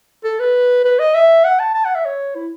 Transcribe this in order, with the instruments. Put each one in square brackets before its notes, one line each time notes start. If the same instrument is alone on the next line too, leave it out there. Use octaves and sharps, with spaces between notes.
[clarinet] A4
B4
B4
D#5
E5
F#5
A5
A5
F#5
E5
C#5
E4